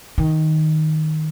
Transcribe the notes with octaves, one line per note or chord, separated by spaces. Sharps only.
D#3